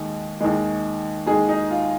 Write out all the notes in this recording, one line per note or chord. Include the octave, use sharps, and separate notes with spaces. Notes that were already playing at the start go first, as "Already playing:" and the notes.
Already playing: D#2 D#3 G#3
D#2 D#3 G#3
D#2 D#3 G#3 G#4
D#4
F4